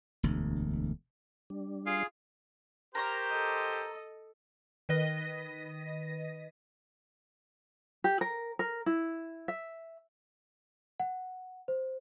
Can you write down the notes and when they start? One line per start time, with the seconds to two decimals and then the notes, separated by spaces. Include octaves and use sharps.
0.23 E1 D2
1.50 G3 D4
1.86 F4 G#4
2.95 G4 A#4 C5 C#5 A#5
3.29 A4 D#5
4.89 D#3 B4 D#5 A#6
8.04 G4
8.21 A#4
8.59 A#4
8.86 E4
9.48 E5
11.00 F#5
11.68 C5